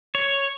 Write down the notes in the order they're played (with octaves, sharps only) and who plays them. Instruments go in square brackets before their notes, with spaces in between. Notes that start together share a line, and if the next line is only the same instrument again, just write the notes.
[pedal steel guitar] C#5